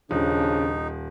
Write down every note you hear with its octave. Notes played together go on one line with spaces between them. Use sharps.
D#1 C#3 F3 D4 D#4